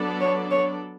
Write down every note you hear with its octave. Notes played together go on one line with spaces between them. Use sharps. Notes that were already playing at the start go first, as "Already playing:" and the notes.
Already playing: F#3 B3 D4 A4 D5
C#5
C#5